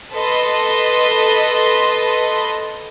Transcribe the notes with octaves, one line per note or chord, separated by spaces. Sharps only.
A4 B4 D#5 C6